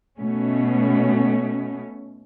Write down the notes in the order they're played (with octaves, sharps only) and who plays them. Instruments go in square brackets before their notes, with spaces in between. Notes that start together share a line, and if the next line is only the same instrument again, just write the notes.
[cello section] B2 A3 C#4